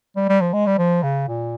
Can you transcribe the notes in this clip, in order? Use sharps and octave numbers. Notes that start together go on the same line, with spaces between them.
G3
G3
F3
G#3
G3
F3
C#3
A#2